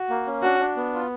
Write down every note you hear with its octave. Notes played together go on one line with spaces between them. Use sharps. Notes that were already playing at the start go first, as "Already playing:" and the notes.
Already playing: F#4
A#3
C#4
D4 F#4
D4
B3
F4